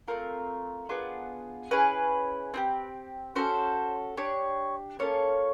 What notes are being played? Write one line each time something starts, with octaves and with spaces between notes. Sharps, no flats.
A3 C4 F4 A#4
B3 D4 F4 G#4
C#4 E4 G#4 B4
C4 E4 G4
C#4 F#4 A4 C5
D4 G4 C#5
A#3 C#4 F4 A4 C#5